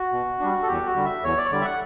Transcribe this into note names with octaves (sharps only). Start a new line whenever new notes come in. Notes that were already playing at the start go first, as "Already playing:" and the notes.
Already playing: F#4
B2
G3 D4
A4
E2 G4
F#4
D3 G3
E5
E2 C#5
D5
C#5
D3 G3 D5
E5
F#5